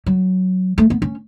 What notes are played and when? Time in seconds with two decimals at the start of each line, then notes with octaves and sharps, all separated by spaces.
0.06 F#3
0.78 A3
0.90 B3
1.02 C#4